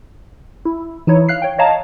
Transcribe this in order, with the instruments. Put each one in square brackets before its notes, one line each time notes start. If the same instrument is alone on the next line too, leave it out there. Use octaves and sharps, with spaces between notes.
[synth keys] E4
E3 D#4 E4 C#5
F5 F#6 C7
C#5 G5
C#5 D#5 F5 A5 A#5